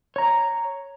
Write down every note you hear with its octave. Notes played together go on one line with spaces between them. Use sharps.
C#5 A#5